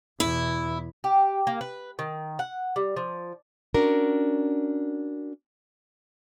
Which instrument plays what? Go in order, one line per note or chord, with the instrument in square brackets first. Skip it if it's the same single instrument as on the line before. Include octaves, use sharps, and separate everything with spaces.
[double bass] E2 B2 [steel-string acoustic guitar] E4
[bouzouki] G4
A#3
B4
D#3
F#5
G3
F3
[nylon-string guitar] C#4 D4 F#4 A#4